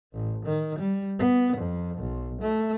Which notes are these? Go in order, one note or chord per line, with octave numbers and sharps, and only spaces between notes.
A1
D#3
G3
B3
F2
B1
A3